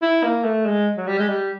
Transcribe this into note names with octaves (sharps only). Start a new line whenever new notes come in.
E4
A#3
A3
G#3
F#3
G3
G#3
G3